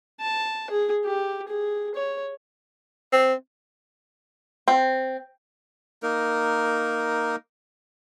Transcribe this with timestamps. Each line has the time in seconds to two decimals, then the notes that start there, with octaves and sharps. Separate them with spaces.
0.20 A5
0.70 G#4
1.05 G4
1.49 G#4
1.95 C#5
3.12 C4
4.68 C4
6.03 A#3 D#4 A#4